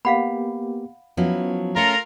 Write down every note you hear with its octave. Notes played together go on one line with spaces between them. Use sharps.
A#3 B3 G4 F5 F#5 B5
F3 F#3 B3 C#4 E4
A3 C#4 F4 A4 A#4 A#5 C#7